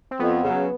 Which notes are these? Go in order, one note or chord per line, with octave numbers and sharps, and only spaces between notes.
C4
F2 B3
C#3 F#3